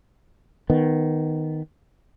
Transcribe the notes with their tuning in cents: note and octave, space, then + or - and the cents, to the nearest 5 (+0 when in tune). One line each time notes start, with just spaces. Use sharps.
D#3 +0 B3 +10